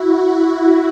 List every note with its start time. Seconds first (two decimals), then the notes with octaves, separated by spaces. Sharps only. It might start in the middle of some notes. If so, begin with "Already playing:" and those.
Already playing: E4 F#4